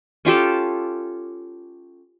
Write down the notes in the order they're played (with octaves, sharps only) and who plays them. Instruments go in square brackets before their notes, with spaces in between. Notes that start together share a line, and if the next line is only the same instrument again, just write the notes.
[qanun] C#4 F4 G4 A4